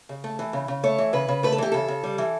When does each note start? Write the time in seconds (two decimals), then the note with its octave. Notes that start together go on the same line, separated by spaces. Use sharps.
0.09 C#3
0.24 A3
0.39 E3
0.53 C#3
0.68 C#3
0.83 A3 C#5
0.98 E3
1.13 C#3 B4
1.28 C#3
1.43 A3 B4
1.52 A4
1.58 E3 G4
1.72 C#3 A4
1.88 C#3
2.03 G3
2.18 E3